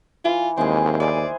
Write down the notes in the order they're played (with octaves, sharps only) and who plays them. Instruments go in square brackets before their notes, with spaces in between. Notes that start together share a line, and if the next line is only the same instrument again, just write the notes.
[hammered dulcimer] E3 [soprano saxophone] F4
[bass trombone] D#2 [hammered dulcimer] G#3 E4 G#4 [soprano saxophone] C4
[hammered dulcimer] G#4 C5 [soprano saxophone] D5